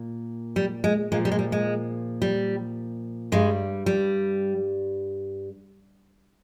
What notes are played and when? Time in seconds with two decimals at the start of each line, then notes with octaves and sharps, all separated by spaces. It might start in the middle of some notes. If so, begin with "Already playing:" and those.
Already playing: A#2
0.56 G3
0.84 G#3
1.12 A#2 F3 G#3
1.25 G3
1.32 G#3
1.39 G3
1.52 G#3
2.22 G3
3.32 G2 G3 G#3
3.86 G3